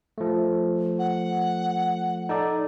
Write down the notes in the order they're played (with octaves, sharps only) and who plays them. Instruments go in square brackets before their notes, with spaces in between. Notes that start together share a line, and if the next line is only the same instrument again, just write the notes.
[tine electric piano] F3 A3
[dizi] F#5
[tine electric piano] D#4 A4 D5